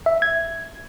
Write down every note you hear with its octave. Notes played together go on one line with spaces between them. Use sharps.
E5
G#6